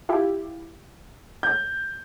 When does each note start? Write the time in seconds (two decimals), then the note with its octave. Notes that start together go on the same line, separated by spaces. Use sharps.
0.09 E4 F4 G4
1.43 G6